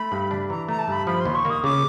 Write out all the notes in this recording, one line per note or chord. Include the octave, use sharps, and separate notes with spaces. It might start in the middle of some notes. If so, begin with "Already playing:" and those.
Already playing: A3 B5
G2
D4
E3 A#5
A3 A#5
A5
G2 B5
F3 B5
D#2 C6
C#6
A#3
D#6
C#3 D6